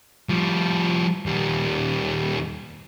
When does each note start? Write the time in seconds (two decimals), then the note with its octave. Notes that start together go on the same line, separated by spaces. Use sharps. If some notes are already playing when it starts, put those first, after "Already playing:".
0.29 F3 G3
1.26 D#2 G3